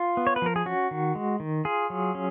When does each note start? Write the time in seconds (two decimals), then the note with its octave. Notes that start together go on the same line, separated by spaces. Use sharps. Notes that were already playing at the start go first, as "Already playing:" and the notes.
Already playing: F4
0.17 B3
0.27 C#5
0.36 B4
0.42 F3 A#4
0.56 G#4
0.66 C#4 F#4
0.91 D#3
1.15 G#3
1.40 D#3
1.65 F4 G#4
1.90 F#3
2.15 C#4